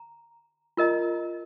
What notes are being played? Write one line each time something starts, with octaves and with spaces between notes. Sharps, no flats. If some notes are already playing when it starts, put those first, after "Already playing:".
Already playing: A#5
F4 A#4 D#5 A#5